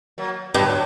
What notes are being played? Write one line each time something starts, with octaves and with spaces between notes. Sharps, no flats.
F#3 A#3
G2 D3 F#3